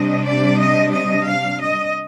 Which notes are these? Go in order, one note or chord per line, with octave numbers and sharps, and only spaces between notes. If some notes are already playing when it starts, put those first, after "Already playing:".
Already playing: C3 G3 D4 D#5
D5
D#5
D#5
F5
D#5